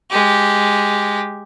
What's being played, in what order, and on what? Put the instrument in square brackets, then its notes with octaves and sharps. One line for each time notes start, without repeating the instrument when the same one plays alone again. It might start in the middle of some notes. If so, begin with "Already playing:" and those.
[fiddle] G#3 G4